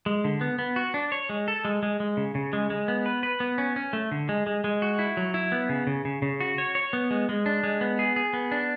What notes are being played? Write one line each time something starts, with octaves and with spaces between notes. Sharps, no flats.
G#3
D3
B3
B3
F#4
D4
C#5
G#3
A4
G#3
G#3
G#3
C#3
C#3
G#3
G#3
B3
B4
B4
B3
C#4
C#4
A3
D3
G#3
G#3
G#3
F#4
E4
F#3
E4
B3
C#3
C#3
C#3
C#3
F#4
C#5
C#5
B3
G#3
G#3
D4
G#3
B3
G#4
G#4
B3
D4